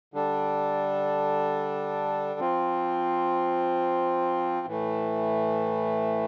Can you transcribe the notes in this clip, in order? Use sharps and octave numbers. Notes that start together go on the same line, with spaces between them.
D3 G3 D4 A4
F3 C4 F4
A2 E3 A3